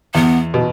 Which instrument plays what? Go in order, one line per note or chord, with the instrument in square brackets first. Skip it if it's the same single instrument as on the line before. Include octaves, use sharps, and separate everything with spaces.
[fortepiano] E2 [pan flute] B3
[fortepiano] B2